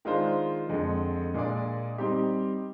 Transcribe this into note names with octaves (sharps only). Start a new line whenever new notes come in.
D#3 G#3 D4 F4 C5
F2 D3 G#3
A#2 G#3 D4 G#4 D5
G3 C4 D#4 G4